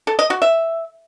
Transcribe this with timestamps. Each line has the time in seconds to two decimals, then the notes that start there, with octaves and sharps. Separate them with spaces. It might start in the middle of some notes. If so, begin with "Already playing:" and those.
0.07 A4
0.19 D#5
0.30 F#4
0.42 E5